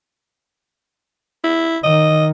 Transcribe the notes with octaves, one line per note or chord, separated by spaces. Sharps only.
E4
D#3 D#5